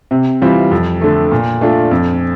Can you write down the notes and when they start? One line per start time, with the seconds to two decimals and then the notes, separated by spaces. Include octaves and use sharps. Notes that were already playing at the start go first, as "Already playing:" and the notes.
0.11 C3
0.42 E3 G3 C4 F4
0.71 F2
1.01 D3 A3
1.32 A#2
1.61 A3 D4 F4
1.91 F2